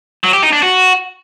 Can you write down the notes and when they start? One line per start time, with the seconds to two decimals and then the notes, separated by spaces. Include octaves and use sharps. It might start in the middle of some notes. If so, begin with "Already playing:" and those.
0.24 F#3
0.33 G4
0.43 D#4
0.53 D4
0.62 F#4